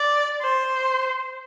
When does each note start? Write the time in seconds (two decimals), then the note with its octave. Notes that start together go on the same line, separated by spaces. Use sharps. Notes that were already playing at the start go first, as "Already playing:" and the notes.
Already playing: D5
0.41 C5